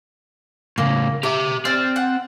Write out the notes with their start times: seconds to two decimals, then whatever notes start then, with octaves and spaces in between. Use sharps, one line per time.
0.78 A2 C#3 A#3
1.23 G4 E5 D6
1.65 C4 D5 F6
1.96 F#5